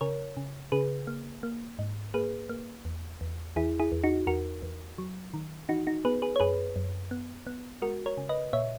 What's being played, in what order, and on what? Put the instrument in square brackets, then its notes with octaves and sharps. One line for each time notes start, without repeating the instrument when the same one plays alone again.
[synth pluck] C#3 A#4 C#5
C#3
C#3 G#4 B4
A#3
A#3
G#2
A#3 G#4 B4
A#3
E2
E2
E2 E4 G#4
E4 G#4
E2
D#4 F#4
E2 F#4 A#4
E2
F#3
D#3
E3 D#4 F#4
D#4 F#4
B3 G#4 B4
G#4 B4
C#5
F#2 G#4 B4
F#2
B3
B3
G#3 F#4 A#4
A#4 C#5
C#3
B4 D#5
A#2 C#5 E5